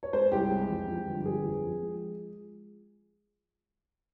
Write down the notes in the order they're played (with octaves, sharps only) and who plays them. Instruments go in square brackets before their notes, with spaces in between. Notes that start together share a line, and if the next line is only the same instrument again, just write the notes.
[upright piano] C#5
G#3 C5
C2 G4
G#3
F2
F3
G1
G3 G#4
F2
F3
G#3